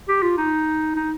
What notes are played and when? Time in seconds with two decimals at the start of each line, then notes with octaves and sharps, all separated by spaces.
0.08 G4
0.22 F4
0.38 D#4
0.96 D#4